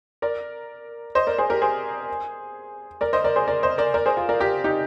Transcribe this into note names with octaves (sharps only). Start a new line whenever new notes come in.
A#4 D5
C5 D#5
A#4 D5
G#4 C5
G4 A#4
G#4 C5
A#4 D5
C5 D#5
A#4 D5
G#4 C5
A#4 D5
C5 D#5
A#4 D5
A#4 D5
G#4 C5
F4 G#4
A#4 D5
G4 A#4
D#4 G4